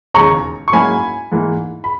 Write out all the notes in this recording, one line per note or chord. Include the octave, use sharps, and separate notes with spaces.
E1 D#2 C#3 G#3 C#4 A#5 C#6
C#6
G#2 F#3 A#3 C#4 E4 G#5 B5
G#2 E3 A#3
B5